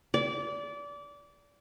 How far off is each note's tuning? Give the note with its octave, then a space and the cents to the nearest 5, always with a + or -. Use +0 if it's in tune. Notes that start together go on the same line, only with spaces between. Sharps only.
D5 -25